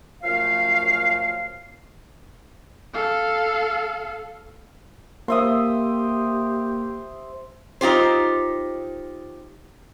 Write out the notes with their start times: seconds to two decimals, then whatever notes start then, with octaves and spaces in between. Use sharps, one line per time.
0.24 F#2 F3 A3 F5
2.94 A4 F5
5.28 A#3 G4 C5 E5 D#6
7.81 D#4 F4 G4 C5